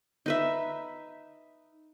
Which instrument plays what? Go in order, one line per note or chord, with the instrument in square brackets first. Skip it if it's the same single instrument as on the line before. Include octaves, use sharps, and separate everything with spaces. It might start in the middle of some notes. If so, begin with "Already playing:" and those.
[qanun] D#4 B4 E5